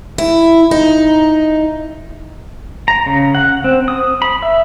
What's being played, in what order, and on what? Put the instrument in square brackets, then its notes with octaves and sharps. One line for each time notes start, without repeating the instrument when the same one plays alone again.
[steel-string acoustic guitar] E4
D#4
[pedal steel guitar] A#5
C#3
F#5
C4
D#6
B5
E5